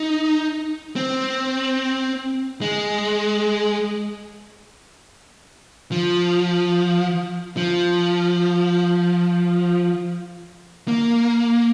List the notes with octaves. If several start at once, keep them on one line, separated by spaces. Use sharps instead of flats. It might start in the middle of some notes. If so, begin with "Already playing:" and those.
Already playing: D#4
C4
G#3
F3
F3
A#3